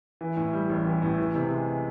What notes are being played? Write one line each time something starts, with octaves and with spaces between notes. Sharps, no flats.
E3
A2
G3
A1
E3
A2
E3
C3
G#3